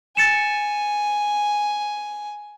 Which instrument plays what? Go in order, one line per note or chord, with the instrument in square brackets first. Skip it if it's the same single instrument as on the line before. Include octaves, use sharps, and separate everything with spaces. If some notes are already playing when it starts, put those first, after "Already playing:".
[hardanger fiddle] G#5 [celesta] A6 C#7 E7